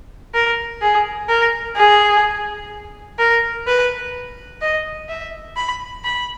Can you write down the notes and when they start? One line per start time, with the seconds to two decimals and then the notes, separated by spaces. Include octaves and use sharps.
0.34 A#4
0.82 G#4
1.29 A#4
1.76 G#4
3.19 A#4
3.67 B4
4.62 D#5
5.09 E5
5.56 B5
6.04 B5